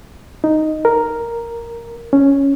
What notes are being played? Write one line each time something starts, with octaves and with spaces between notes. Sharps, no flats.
D#4
A#4
C#4